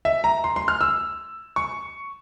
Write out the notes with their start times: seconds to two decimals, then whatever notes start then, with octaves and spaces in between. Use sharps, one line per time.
0.05 E5
0.24 A#5
0.44 C6
0.56 C6
0.68 F6
0.81 E6
1.56 C#6